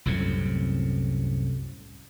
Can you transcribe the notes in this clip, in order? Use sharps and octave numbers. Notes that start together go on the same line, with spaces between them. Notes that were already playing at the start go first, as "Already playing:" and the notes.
C2 F#2 A2 C3